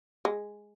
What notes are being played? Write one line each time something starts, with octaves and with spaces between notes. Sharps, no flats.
G#3